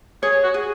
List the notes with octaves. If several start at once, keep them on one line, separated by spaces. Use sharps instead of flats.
G#4 C#5
F#4
G#4